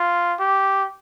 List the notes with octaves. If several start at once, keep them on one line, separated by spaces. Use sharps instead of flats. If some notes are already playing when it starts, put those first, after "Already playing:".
Already playing: F4
G4